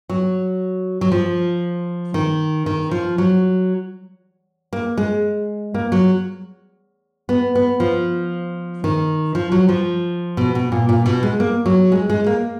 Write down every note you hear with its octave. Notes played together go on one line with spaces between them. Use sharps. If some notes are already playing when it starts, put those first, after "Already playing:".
F#3
F#3
F3
D#3
D#3
F3
F#3
A#3
G#3
A#3
F#3
B3
B3
F3
D#3
F3
F#3
F3
B2
B2
A#2
A#2
B2
G#3
A#3
F#3
G#3
G#3
A#3